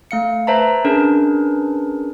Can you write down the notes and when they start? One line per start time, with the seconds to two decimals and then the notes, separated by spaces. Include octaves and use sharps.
0.11 A3 F5 C#7
0.47 B4 C5 E5 A5 A#5
0.84 C#4 D4 G#4 A#4 B4